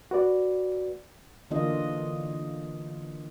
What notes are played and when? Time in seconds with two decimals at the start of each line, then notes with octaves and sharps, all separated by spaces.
0.11 F#4 B4 D5
1.51 D3 E3 A#3 D4 F4 D#5